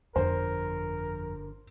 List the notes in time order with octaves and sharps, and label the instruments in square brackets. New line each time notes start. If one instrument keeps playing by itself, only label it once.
[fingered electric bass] G1 D3 [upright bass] F2 [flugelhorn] A#4 [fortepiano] C5